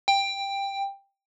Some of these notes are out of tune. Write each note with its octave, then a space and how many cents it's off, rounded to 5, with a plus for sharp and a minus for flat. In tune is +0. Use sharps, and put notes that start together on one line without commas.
G5 +10